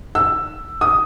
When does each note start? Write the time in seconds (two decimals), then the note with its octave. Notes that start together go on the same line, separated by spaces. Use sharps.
0.15 E6
0.81 D#6